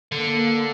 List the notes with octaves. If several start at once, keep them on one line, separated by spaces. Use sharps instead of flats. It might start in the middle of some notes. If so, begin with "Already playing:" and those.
D3 A#3